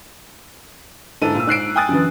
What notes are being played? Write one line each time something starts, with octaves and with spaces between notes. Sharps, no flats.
G#2 D3 E4 A4 D#7
A#2 E6
G#2 F#6 C7 D7
G5 G#5 D#6 F#6 A6
F#2 D3 E3